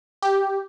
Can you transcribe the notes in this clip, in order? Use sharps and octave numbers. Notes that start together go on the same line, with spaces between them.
G4